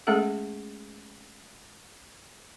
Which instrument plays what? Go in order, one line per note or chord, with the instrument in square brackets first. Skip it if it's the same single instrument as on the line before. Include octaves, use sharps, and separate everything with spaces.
[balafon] G#3 A3 C#4 G#4 A4 F#5